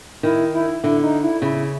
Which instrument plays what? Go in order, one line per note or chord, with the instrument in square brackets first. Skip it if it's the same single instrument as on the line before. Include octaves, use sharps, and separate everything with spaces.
[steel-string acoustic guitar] D#3 [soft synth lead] E4
[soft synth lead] E4
[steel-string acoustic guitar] D3 [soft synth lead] E4
[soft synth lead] D#4
E4
[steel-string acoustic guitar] C#3 [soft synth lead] E4